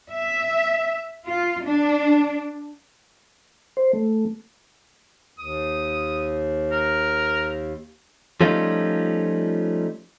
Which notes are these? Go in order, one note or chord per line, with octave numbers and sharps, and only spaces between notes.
E5
F4
D4
C5
A3
D#2 D#6
A#4
F3 G3 A3 C#4 D#4 F4